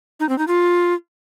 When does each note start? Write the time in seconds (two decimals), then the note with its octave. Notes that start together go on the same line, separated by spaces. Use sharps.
0.20 D#4
0.29 C4
0.38 D#4
0.48 F4